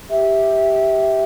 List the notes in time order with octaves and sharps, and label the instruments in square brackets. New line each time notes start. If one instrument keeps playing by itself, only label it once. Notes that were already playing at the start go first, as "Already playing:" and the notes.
[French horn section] G4 [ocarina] E5